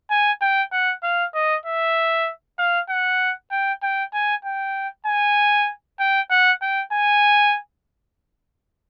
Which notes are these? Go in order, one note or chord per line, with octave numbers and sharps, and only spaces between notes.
G#5
G5
F#5
F5
D#5
E5
F5
F#5
G5
G5
G#5
G5
G#5
G5
F#5
G5
G#5